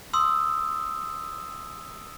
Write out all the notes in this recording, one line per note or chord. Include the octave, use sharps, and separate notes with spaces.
C6 D#6 E6